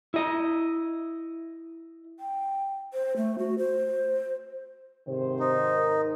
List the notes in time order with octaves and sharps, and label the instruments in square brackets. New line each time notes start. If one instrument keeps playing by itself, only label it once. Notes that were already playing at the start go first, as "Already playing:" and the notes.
[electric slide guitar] E4 D#5
[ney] G5
C5
A3
F#4
C5
[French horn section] G#2 D#3 C5 [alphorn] C3
[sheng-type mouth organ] D#4
[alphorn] A#4